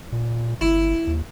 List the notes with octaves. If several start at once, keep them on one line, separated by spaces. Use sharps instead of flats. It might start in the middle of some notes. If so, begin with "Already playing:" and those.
A#2
G1 E4
D#2